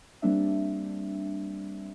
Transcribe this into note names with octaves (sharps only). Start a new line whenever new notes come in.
G3 A#3 C4 D4 E5